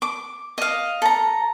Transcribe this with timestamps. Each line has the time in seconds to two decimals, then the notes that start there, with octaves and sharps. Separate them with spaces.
0.02 D6
0.58 D#5 F5
1.02 A4 A#5